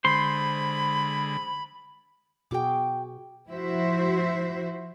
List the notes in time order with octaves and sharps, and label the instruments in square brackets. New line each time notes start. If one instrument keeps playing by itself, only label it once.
[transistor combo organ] D3 G#3 [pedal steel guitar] C5 C6 [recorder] B5
[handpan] B2 F#4 G#4 [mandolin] G5 D6
[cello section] F3 E4 F#4 C5 E5